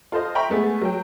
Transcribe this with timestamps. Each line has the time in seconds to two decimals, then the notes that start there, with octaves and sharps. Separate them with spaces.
0.12 F4 A4 C5 D#5
0.35 C5 E5 G5 A#5 B5 C#6
0.49 G#3 A3 B3 G#4
0.82 F#3 G5